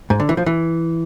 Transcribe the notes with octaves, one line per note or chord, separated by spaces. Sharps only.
G#2
D3
E3
F3
E3